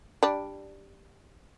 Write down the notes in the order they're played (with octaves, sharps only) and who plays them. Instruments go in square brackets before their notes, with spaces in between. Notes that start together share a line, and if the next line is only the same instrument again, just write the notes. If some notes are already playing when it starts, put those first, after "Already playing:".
[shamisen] G3 D4